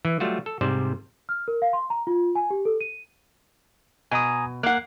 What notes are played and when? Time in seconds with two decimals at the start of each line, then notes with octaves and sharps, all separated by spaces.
0.05 E3
0.20 F#3 G3 A3 F4 F#4
0.46 A4
0.61 G#2 C3 G3 C5 D5
1.29 F6
1.48 A#4
1.62 F5
1.73 C6
1.90 A#5
2.07 F4
2.35 G#5
2.50 G4
2.65 A4
2.81 D#7
4.11 B2 G#5 A#5 D#6
4.63 A#3 F#5 F#6 C7